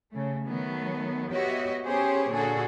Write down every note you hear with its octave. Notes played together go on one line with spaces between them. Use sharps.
C#3 A3
D#3 F#3 A3 B3
B3 F#4 G4 C#5 D#5 E5
B3 C#4 G4 G#4 C5 C#5
A#2 D3 F#4 G#4 A4